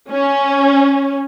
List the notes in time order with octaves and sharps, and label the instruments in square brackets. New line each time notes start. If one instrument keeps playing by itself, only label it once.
[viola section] C#4